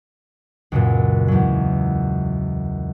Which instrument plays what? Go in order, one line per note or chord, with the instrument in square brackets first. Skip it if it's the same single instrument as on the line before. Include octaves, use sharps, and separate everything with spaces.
[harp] C#2 F#2 A#2
E2 F#3